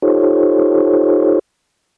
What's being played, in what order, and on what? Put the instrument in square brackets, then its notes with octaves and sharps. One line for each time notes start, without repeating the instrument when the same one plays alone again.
[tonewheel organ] D#4 F4 G4 A4 C5 C#5